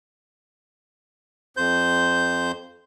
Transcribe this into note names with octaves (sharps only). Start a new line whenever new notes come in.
F2 C5 G6